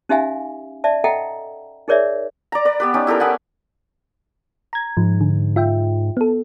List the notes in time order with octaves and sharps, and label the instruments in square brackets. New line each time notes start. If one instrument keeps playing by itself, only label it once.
[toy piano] C#4 D#4 G4 E5 F5 G#5
D5 E5 A5
A4 D#5 E5 F#5 G5 A#5
D#4 G#4 A#4 C#5 D5 E5
[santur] D5 A#5
B4 D5
B3 G4 B4
C#4 D#4 G4
E4 G4 A4 A#4
B3 F#5 G#5
[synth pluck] A#5 G#6
[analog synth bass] G#2 [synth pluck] F3
[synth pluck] D3
F4 E5 G5
B3 A4